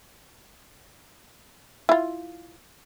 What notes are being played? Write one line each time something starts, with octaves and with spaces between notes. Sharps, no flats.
E4 F4